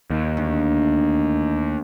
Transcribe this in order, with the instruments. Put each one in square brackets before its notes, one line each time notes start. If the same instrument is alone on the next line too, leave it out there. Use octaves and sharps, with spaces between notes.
[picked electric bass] D#2
[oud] D2